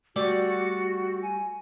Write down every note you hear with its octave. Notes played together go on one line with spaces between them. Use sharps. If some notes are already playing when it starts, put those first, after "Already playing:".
G3 A3 F#4 D5
G#5